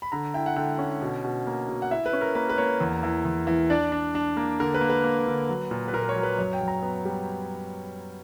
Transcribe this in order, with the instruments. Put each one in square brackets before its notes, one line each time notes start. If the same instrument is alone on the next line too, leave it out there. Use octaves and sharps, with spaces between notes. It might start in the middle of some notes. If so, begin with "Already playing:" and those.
[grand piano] B5
D3 A#5
E4 G5
F#5
D3 G5
C#4
B2
B2
A#3
B2
F#5
E4 E5
B4
C#4
A#4
A#3 B4
B4
A#3 C#5
E2
E3
E2
E3
D4 D5
D4
D4
A#3
D3 A#4
B4
A#3
B4
A#3
D3
F#3
A#2
B4
A#2 A#4
B4
C#5
F#3
B4
F#2 C#5
G5
F#2
A#5
B3
G3